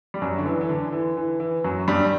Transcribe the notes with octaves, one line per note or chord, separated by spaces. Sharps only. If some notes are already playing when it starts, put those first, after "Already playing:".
G3
F#2 F#3
D3
E3
E3
D3
E3
E3
E3
F#2 F#3
G2 G3